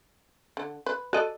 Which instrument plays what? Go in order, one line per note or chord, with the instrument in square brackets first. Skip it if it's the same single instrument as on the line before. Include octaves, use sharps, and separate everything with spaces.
[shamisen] D3
B4
[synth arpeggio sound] F#4 D#5 [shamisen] A4 D5